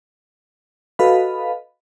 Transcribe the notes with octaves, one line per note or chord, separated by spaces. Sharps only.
F#4 A4 B4 D#5 F5 B5